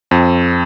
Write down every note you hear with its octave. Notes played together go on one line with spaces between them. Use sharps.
F2